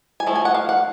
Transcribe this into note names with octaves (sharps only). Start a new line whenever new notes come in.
G#5
F3 A3
G#5
F#5
F5
F#5